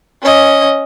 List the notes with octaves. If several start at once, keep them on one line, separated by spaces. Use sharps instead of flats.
C#4 D#5